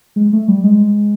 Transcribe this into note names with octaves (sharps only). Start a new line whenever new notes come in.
G#3
A3
G3
G#3